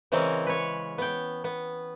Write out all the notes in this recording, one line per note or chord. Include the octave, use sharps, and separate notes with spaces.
C#3 E3 G#3 C4 C#4 A#4
B4 C#5
B3 G5
B3